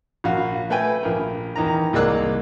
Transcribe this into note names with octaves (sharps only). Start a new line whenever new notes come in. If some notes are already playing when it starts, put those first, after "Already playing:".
A#1 F#4 F5
A3 B4 G5 G#5
A#1 A#4
E2 D#3 A#5
C2 G#3 A#3 D5 E6 F#6